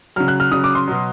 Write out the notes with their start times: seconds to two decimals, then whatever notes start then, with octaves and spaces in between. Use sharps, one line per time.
0.16 C#3 F#3 F6
0.28 F#6
0.40 F6
0.52 C#3 F#3 D#6
0.64 D6
0.75 C6
0.88 B2 F#3